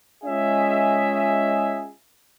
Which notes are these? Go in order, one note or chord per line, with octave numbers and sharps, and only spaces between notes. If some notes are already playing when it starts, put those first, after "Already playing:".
G#3 C#4 F4 G#4 D#5 E5